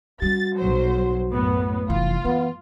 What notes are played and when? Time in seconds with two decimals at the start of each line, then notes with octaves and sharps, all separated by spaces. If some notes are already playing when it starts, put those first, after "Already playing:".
0.22 G3 C#4 F#4 A6
0.57 B1 F#3 C5
1.30 F#2 A2 B3
1.90 F1 E3 F4
2.25 E3 B3